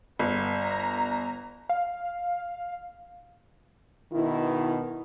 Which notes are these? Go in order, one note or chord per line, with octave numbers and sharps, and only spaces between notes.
G1 B3
A#5
F5
B2 D#3 E4